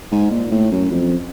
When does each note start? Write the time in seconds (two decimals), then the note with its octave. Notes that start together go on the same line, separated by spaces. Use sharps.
0.12 G#2
0.31 A#2
0.51 A2
0.72 F#2
0.91 F2